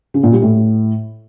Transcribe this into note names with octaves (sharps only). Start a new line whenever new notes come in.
C#3
A#2
G3
A2